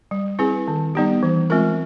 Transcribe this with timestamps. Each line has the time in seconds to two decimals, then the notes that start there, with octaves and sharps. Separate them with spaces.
0.11 G3
0.39 C4 E4 G#4 B4
0.68 D#3
0.95 G3 B3 D#4 G4
1.23 E3
1.50 G#3 C4 F4 A#4